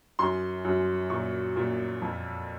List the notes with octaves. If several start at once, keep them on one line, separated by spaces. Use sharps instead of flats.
F#2 C6
F#2
A#2 C#6
A#2
F2